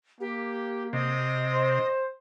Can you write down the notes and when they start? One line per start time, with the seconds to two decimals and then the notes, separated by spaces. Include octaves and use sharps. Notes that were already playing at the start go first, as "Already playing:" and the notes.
0.20 A#3 G4
0.93 C3 D#5
1.53 C5